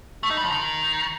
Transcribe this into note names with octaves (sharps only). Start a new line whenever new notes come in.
A3
D#4
G3
F3
D#3